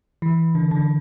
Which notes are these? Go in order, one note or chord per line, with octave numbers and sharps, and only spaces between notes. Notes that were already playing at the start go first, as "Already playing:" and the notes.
E3
D3
D3